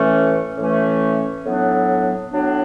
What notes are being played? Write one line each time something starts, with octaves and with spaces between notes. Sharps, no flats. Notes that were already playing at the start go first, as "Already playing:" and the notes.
Already playing: A2 E3 A3 C#4
A2 E3 A3 C#4
A2 F#3 B3 D4
A2 F#3 B3 D4